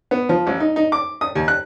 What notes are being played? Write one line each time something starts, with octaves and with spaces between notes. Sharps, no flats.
B3
F3
A1
D#4
D#4
D6
D#6
D#2
F#6